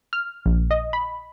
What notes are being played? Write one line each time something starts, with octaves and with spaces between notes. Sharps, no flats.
F6
A#1
D#5
B5